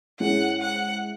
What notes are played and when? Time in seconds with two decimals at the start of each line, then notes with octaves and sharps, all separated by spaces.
0.20 G#2 G#3 C#4 E4 F#5
0.62 F#5